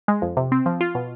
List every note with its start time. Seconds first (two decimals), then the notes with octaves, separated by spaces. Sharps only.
0.08 G#3
0.22 F2
0.37 C3
0.52 C4
0.66 F3
0.81 F4
0.95 B2